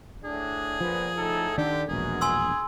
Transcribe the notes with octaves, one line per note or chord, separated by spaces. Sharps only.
A2 D4 G#4
A#2 F3 B3
A2 D#4 A4
D3 D#3 D4 G4
E1 A#1 F#2 B2 G#4 A#4
G#5 C6 E6